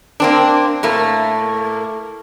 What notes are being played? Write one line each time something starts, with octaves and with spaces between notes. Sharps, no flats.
A#3 C4 D4
A2 A3 A#3